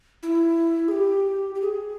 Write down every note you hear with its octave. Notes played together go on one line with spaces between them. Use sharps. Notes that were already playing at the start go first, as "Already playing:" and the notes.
E4
G#4
G4
G4
G#4